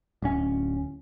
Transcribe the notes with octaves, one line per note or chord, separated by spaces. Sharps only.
D1 C#4